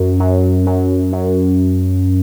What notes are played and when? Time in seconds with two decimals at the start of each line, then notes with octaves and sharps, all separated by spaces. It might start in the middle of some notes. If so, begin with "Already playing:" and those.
Already playing: F#2
0.20 F#2
0.67 F#2
1.13 F#2